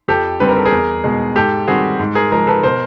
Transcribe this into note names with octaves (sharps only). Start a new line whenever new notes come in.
F2 G4 A4
D3 G3 C4 B4
A#4
A4
G#4 A#4
E2
B2 G#3
G#2 G4 A4
D#3 G3 C4 F#4 G#4
G#2
G#4 A#4
F3 G#3 G#4 A#4
A4 B4
B2 A#4 C5